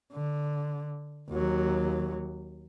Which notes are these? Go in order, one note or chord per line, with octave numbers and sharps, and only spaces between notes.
D3
D#2 F#3